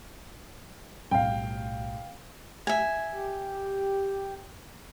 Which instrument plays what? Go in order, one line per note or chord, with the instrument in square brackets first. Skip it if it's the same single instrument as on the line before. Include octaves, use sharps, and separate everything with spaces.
[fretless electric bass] B1 A2 G3 [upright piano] F5 G5
[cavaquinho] E5 G#5
[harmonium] G4